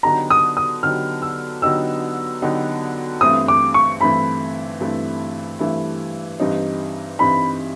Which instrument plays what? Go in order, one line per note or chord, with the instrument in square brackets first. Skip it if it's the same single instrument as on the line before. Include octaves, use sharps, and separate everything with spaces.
[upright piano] D3 F#3 B3 D#4 G4 [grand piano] A#5
[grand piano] D#6
D#6
[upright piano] D3 F#3 B3 D#4 G4 [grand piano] F6
[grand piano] E6
[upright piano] D3 F#3 B3 D#4 G4 [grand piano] E6
[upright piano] D3 F#3 B3 D#4 G4
[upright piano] G2 E3 A3 C4 E4 [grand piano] D#6
[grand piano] D6
C#6
[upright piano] G2 E3 A3 C4 E4 [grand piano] B5
[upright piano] G2 E3 A3 C4 E4
G2 E3 A3 C4 E4
G2 E3 G3 C4 D#4
[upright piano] G2 E3 G3 C4 D#4 [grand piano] B5